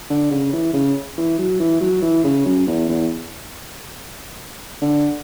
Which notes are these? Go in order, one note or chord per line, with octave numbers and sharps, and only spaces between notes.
D3
C#3
E3
C#3
E3
F#3
E3
F#3
E3
C#3
F#2
E2
E2
D3